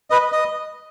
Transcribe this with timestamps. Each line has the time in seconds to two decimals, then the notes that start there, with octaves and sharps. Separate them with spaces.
0.10 B4 D#5
0.32 D#5